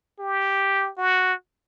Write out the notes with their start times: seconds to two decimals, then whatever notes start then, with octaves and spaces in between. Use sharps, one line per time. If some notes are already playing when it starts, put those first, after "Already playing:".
0.20 G4
0.98 F#4